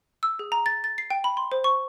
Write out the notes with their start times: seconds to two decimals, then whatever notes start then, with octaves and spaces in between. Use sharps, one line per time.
0.23 E6
0.39 G#4
0.52 A#5
0.66 A6
0.84 A6
0.98 C7
1.10 G5
1.24 B5
1.37 C6
1.52 C5
1.64 C#6